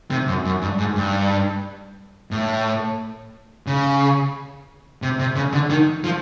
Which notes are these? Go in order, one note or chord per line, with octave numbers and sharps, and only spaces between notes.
C3
F#2
F#2
G2
G#2
G2
A2
C#3
C3
C3
C#3
D3
D#3
F3